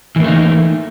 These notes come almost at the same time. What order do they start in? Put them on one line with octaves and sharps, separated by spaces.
E3 A#3 A3 D#4